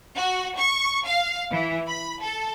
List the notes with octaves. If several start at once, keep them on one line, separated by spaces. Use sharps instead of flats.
F#4
C#6
F5
E3
B5
A4